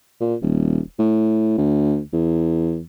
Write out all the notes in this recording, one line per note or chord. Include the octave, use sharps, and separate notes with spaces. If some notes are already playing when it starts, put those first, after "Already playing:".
A#2
D#1
A2
D2
E2